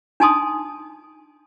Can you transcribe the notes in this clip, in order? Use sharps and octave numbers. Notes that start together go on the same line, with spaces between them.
D4 D#4 G#5 A5 C6 D#6